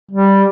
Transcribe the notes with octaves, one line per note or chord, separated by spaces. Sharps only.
G3